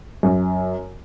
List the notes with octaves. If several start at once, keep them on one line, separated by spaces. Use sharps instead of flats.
F#2